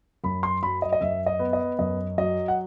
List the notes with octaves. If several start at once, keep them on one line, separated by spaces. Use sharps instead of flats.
F#2 B5
C6
F#3 B5
D#5
D#5
F#2 E5
D#5
B3
D#5
F#2 D#5
F#3 D#5
F#5